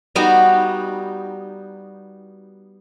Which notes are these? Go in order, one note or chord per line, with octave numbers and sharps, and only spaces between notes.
G3 B3 D#4 F#4